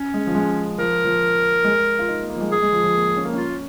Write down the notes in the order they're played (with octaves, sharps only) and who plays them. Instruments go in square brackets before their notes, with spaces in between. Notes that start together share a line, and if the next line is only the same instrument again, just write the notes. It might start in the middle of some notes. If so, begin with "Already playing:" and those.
Already playing: [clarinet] C#4
[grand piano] G#3
F3
G#3
[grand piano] F3 [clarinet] A#4
[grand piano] F3
G#3
F4
D#4
A#3
A#3
F3
G#3
[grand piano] G#3 [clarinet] G#4
[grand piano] G#3
F3
F3
A#3
C#4
A#3
[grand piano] C#4 [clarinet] F4